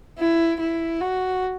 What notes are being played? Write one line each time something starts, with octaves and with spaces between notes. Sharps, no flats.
E4
E4
F#4